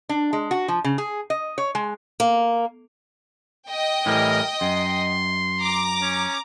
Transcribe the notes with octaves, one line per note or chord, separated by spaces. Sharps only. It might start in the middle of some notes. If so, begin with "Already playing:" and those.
D4
G#3
F#4
F3
C#3
G#4
D#5
C#5
G#3
A#3
D#5 G5
A2 E3 G3 A#4
F#2 C6
A#5 D6
C#4